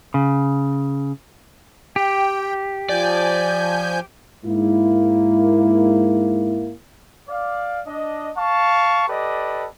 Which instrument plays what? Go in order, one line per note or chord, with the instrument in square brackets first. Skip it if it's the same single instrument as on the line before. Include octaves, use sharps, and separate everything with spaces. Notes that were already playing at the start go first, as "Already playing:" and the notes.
[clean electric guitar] C#3
[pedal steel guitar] G4 [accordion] G5
[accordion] F3 G#5 G6 [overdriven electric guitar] D5
[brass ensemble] G#2 A#3 E4
[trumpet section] D5 F5
D4 D#5
F5 A5 C#6
G4 A4 B4 D5 D#5